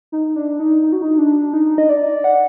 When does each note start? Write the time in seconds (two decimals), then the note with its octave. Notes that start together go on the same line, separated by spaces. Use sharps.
0.12 D#4
0.36 D4
0.59 D#4
0.83 D#4
0.93 F#4
1.02 D#4
1.18 D4
1.53 D#4
1.78 D#5
1.89 D5
2.24 F#5